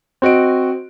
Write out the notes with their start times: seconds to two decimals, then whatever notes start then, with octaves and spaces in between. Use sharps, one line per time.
0.22 C4 F#4 D#5 D7